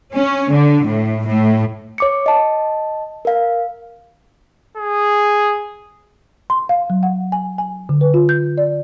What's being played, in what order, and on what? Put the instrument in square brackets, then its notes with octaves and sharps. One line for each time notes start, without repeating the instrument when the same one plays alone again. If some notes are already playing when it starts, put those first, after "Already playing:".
[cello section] C#4
D3
A2
A2
[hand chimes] C#5 D6 C#7
D#5 A5
A#4 F5
[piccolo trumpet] G#4
[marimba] C6
F5
F#3
F#5
G#5
G#5
D3
B4
F4
G6
D5